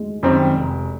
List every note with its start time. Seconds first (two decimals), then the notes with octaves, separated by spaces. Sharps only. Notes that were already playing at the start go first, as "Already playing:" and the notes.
Already playing: G#3
0.23 F#2 D#3 G3 C4
0.57 F1